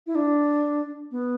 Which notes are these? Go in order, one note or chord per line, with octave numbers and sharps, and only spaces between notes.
E4
D4
B3